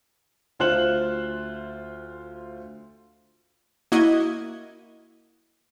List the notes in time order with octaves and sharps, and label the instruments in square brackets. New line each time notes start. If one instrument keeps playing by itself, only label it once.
[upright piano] D2 F4 C5 F#6 E7 F#7
[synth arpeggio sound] A#3 E4 F#4 D#5 G#6